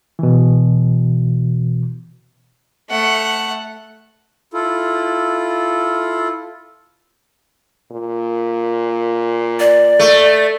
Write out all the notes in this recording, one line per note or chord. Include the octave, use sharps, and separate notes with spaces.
B2 E3
A3 F#5
E4 F4 A4
A#2
D5
A3